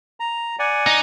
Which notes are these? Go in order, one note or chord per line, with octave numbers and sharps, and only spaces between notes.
A#5
D5 F#5 G#5
D#4